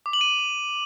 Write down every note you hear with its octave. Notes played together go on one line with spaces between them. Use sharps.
D6
F#7
D#7